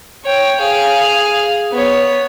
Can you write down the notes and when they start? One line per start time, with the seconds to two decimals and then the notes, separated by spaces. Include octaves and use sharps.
0.25 C#5 G5
0.60 G#4 F5
1.72 B3 C#5